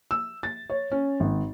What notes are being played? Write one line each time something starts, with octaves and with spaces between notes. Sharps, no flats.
E6
A6
C#5
C#4
G#1